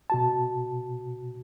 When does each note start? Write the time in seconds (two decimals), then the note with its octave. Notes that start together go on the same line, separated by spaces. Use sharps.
0.10 B2 F#4 A5